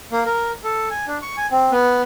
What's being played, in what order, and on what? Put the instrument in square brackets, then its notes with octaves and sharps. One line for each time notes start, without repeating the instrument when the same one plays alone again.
[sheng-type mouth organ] A#3
A#4
A4
G#5
D4
C#6
G#5
C4
B3